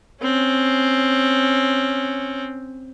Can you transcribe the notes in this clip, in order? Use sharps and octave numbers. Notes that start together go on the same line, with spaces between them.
C4 C#4